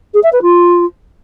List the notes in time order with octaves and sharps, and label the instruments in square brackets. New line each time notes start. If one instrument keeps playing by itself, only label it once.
[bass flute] G#4
E5
B4
F4